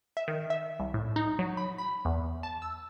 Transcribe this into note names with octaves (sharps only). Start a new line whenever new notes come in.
E5
D#3
E5
C2
A2
D#4
F#3
B5
B5
E2
A5
E6